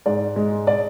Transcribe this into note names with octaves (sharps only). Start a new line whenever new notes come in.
G#2 D5
G#3
D5